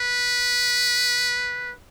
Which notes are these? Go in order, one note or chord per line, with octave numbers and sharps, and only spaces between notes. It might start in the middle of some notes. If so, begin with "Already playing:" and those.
Already playing: B4